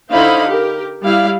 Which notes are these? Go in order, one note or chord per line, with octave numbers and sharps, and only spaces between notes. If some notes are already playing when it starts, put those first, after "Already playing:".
D3 D#4 E4 C5 F5 B5
G4 A#4
G3 E4 F5